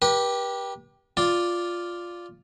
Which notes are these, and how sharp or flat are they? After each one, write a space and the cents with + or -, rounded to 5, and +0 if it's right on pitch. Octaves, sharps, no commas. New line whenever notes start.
G4 +0 B4 -40
F4 +0 D5 +0